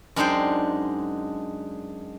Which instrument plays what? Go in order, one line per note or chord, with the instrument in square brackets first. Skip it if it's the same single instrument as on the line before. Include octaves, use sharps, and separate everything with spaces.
[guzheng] F#2 G#3 D4 D#4 C5 G5